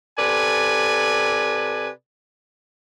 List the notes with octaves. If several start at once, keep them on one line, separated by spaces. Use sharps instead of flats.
C3 A4 B4 D5 G#5